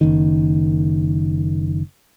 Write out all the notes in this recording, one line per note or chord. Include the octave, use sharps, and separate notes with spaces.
F#1 D#3